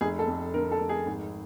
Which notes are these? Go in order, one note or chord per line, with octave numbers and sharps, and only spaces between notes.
F1 G#4
A4
F2
D3 A#4
A4
F1
G#4
G#1